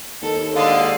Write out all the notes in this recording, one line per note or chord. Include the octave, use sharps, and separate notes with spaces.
D#2 A4
D3 G#3 D5 F5